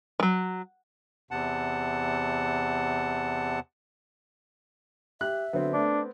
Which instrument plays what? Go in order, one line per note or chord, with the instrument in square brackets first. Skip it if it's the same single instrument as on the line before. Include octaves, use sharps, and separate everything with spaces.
[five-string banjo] F3 F#3
[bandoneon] E2 C3 F#5 A5
[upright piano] G4 [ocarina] E5 [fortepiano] F#6
[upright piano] D3 F#3 [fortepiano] B3 C4
[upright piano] A3 [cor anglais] D4